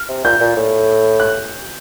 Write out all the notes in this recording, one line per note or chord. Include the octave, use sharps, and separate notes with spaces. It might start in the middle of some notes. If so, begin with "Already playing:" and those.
Already playing: F6
C3
A#2 G6
A#2
A2
F#6